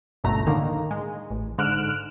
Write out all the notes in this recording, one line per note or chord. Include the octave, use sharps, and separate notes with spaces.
G1 C#2 G2 B2 A3 A#5
A2 D3 D#3 A#3
G#3
A1
G#2 D3 F6 F#6 D7 E7